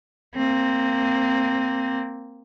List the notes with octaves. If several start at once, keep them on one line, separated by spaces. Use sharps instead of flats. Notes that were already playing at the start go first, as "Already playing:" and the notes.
A#3 C4